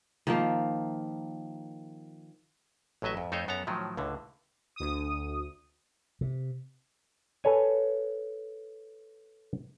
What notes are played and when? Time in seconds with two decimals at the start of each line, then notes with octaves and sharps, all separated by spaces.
0.27 D#3 F3 A#3
3.02 A1 A2 F#3 D#5 E5
3.17 F2
3.32 F2 A3 D#4 C5 C#5 D#5
3.48 F#2 B3 A4 A5 A#5
3.67 A2 D#3 F3 F#3
3.97 C#2 A2 D3
4.76 D2 D#6
6.21 C3
7.44 A4 B4 C#5 G#5